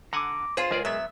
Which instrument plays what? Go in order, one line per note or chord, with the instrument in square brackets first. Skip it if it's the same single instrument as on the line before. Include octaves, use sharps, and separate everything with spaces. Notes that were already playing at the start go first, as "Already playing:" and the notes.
[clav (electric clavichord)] D3 F#5 G#5 [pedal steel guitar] A#5 D6
[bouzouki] F4 C5 [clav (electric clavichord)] G#4
[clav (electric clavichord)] C#2 G#4 D5 [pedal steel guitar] G#3 A#4
[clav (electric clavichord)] F#3 B3 [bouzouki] E5